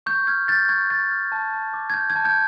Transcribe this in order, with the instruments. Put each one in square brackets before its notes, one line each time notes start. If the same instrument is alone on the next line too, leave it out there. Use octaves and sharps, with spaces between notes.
[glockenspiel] C#6 G6
F6 G#6
F6 G6 A6
C#6 G#6
C#6 G6 A6
F6
A5
A5
D6
G#6
G6
G#6
A5
G6